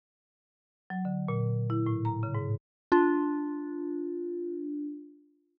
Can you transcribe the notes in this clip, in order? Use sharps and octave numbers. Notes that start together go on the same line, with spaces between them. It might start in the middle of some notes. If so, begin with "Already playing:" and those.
F#3
D3
A#2
E4
A2
A#5
C#3
G#2
D4 F4